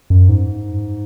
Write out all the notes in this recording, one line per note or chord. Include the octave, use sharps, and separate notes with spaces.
F#2
G#2